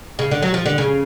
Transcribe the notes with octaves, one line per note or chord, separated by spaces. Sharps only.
C#3
D3
F#3
F3
D3
C#3